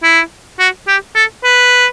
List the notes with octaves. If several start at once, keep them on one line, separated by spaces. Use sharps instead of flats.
E4
F#4
G4
A4
B4